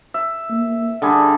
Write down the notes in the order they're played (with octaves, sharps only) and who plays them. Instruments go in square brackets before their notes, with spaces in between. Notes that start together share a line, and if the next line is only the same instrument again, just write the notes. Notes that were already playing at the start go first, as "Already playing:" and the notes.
[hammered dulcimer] E5
[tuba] A#3
[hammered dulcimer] D3 G3 G#4